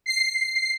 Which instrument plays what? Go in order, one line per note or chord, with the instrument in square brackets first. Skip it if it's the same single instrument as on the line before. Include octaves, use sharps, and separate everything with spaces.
[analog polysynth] C7